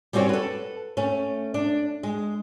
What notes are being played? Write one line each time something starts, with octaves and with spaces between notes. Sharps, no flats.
G3 C4 C#4 F#4 C#5
A4 B4
A3 C#4
D4
G#3